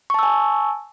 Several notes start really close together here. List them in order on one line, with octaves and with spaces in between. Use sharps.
C#6 A5 E6 G#5